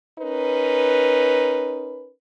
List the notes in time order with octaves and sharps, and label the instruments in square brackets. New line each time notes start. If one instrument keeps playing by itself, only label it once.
[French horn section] C#4 D#4 A#4 B4